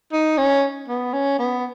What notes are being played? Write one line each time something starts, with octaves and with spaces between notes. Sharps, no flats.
D#4
C#4
B3
C#4
B3